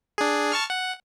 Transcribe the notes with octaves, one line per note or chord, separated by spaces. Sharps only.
D4 G#4
A5 C#6 F6
F#5